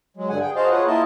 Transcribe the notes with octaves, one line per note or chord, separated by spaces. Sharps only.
F#3 G#3
G2 D3 F#5 G#5
G#4 G5
F#4 G#4 C5 D#5 F5 A5
F4 G#4 B4 C#5 F#5
A#3 E4 F4 A#4 D#5 A5